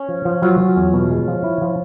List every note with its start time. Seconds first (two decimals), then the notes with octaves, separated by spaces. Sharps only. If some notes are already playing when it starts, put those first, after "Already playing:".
Already playing: C#4
0.09 F3
0.25 F3
0.42 F#3 F4
0.60 F#3
0.76 E2
0.93 B2
1.11 G#3
1.28 F3
1.44 E4
1.62 F3